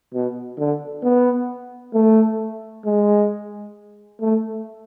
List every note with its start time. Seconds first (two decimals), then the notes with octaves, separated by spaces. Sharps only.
0.14 B2
0.59 D3
1.03 B3
1.94 A3
2.85 G#3
4.21 A3